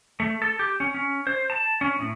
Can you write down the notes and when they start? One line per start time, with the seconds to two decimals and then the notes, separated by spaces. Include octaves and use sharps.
0.20 A3
0.42 A4
0.59 G4
0.80 C#4
0.94 C#4
1.27 C5
1.50 A5
1.81 C#4
1.99 A2